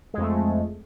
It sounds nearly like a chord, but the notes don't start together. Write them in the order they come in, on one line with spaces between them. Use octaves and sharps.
G#3 F2 A3